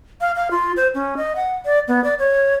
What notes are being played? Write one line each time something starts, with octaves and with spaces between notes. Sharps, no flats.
F5
F5
F4
C5
C#4
D#5
F#5
D5
B3
D5
C#5